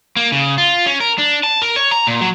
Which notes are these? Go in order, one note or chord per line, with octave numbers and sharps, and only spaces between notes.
A#3
C#3
F4
C#4
A#4
D4
A5
A#4
C#5
A#5
A#2
F#3